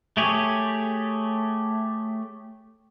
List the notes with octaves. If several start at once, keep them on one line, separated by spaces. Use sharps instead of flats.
A3 G4 G#4 C#5